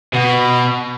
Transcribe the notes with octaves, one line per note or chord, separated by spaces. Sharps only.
B2